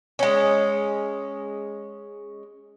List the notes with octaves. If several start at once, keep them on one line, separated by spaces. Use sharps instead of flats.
G#3 C#4